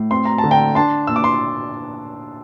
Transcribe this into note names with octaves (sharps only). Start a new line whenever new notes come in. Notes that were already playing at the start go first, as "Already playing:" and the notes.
Already playing: A2
C4 C6
A#5
A5
D3
G5 A#5
D4 A5 C6
A#2 E6
D6
C6